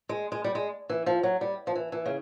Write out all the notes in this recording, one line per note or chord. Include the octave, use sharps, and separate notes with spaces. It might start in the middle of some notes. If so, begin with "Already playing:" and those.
G#3
G#3
G3
G#3
E3
F3
F#3
G3
F3
E3
E3
C#3